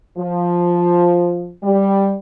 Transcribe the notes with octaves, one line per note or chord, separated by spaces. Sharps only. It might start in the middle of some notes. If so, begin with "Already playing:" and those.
F3
G3